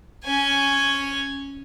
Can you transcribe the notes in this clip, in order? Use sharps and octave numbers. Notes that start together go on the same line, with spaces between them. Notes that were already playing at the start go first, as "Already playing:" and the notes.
C#4 G#5